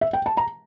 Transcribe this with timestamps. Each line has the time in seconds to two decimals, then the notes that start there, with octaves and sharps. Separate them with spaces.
0.01 E5
0.13 G5
0.26 A5
0.37 A#5